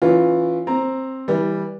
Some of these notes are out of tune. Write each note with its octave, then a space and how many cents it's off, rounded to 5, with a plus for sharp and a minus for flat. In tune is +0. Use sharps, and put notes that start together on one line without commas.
E3 +0 C#4 +0 F4 +10
C4 +10 A#5 +0
E3 -25 G3 +0